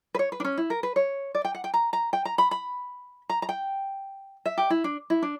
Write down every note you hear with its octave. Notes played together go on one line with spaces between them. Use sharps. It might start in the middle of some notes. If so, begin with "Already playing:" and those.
B4
C#5
B4
D4
C#4
E4
A#4
B4
C#5
D5
G5
F#5
G5
A#5
A#5
G5
A#5
B5
B5
A#5
A#5
G5
E5
G4
E4
D4
E4
D4